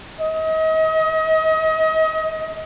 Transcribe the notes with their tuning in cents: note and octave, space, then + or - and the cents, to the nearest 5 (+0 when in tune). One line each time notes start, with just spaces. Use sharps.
D#5 +35